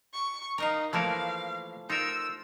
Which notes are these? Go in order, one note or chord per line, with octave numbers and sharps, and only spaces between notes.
C#6
D#4 A#4 D#5 F5
E3 F3 A3 A#3 A4 A#4 F5
D#4 F4 A#4 E6